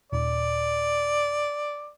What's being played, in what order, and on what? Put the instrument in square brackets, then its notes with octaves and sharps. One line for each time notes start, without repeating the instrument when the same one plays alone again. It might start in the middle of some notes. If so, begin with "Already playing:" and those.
[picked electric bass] D#1 [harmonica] D5